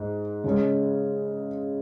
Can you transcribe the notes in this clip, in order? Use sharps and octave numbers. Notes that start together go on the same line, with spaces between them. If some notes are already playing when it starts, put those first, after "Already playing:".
Already playing: G#2
C#3 G#3 C#4